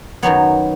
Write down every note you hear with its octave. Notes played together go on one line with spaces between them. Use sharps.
F#2 D#3 F#3 B3 C#5